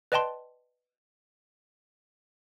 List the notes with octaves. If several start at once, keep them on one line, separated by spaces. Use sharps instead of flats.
B4 D5 D#5 G5 A5 C6